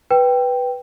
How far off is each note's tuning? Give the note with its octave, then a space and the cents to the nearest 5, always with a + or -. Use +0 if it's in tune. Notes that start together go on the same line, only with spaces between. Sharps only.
B4 +0 G5 +0